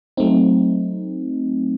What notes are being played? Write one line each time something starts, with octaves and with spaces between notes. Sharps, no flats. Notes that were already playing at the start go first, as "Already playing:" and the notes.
F#3 A3 C4 D#4